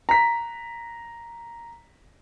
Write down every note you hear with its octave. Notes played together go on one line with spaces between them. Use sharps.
A#5 B6